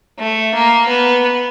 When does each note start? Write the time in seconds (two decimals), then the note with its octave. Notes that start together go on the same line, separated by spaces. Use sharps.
0.19 A3
0.54 A#3
0.89 B3